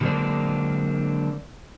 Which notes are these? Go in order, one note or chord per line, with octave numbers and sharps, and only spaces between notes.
D3 F#3 G#3 A#3 C4 D4